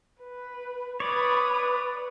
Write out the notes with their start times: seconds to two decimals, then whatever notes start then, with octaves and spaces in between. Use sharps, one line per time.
0.21 B4
1.00 B4 C#5 D5 B5 D#6